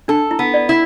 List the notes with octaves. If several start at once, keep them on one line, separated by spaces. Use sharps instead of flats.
D4 A4
E4
B3
D5
E4